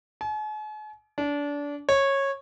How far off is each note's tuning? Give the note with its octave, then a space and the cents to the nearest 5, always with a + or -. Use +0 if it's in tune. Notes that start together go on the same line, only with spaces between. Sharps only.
G#5 +45
D4 -25
C#5 -15